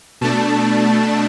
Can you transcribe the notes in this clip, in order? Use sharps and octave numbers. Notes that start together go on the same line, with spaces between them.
B2 A3 D4 A5